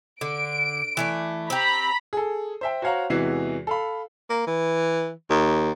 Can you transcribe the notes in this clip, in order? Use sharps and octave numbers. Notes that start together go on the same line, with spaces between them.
D3 D7
E3 A3 D5
C4 G4 A#5 B5
G#4 A4
C5 E5 G5
F#4 C5 C#5 F5 F#5 A#5
E2 C3 E3 G#3 F#4 C7
A4 F5 B5
A#3
E3
D#2